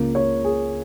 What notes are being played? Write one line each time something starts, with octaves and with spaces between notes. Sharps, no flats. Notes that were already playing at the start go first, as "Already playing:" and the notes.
Already playing: C#2 C#3 A#3
C#5
G#4